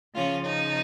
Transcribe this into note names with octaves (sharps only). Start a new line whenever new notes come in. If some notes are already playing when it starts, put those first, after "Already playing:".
C#3 F3 C#4 F4
D#4